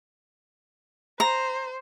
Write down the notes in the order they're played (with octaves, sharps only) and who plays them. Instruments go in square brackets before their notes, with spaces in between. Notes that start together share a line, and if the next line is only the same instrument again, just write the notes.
[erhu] C5 [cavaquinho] A#5